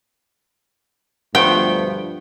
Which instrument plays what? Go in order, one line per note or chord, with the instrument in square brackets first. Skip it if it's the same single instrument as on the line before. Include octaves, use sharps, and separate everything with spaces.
[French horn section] D2 G2 F3 [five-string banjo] A3 B3 C5 [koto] G5